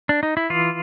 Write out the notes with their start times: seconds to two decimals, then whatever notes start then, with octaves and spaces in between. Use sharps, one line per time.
0.09 D4
0.23 D#4
0.37 E4
0.50 E3 F4